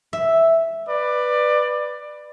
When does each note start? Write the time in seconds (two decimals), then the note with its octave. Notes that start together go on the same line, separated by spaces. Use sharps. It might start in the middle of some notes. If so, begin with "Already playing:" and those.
0.13 E5
0.88 B4 D5